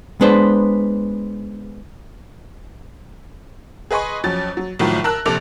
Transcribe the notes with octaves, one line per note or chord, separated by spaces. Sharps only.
G#3 B3 D4 B4 C5
G#4 B4 D#5 G#5 C6 C#6
F2 F#3 C#4 A6
F#3
C2 A2 D#3 F3 F#3
A#4 A5 E6 F#6
A#1 C3 A4 D6 F7